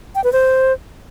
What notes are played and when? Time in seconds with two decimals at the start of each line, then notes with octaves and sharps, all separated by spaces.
0.15 G5
0.24 B4
0.33 C5